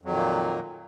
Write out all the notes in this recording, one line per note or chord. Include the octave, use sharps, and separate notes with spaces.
F2 A#2 D#3 F#3 A#3